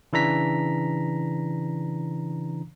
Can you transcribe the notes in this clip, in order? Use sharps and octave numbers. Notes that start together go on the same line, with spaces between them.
C#3 E3 D4 A#5 B6